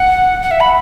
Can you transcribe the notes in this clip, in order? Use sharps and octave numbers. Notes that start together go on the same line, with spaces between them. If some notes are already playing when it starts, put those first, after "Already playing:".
Already playing: F#5
F#5
E5
B5